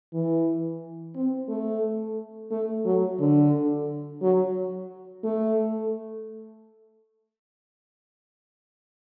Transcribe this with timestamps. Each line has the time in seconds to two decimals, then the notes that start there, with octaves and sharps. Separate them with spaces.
0.13 E3
1.16 C4
1.49 A3
2.51 A3
2.85 F#3
3.20 D3
4.22 F#3
5.24 A3